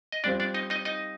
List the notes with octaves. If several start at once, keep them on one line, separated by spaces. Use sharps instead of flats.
D#5
G3 C4 D4 F4 D5
D4 D5
D#4 D#5
D#4 D#5
D#4 D#5